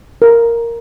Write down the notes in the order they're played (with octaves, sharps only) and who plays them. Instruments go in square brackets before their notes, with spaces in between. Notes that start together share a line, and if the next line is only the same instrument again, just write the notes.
[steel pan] A#4